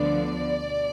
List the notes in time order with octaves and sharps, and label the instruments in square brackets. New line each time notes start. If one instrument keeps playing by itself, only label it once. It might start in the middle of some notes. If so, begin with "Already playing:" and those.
Already playing: [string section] D2 D3 F3 B3 D4 D5
B2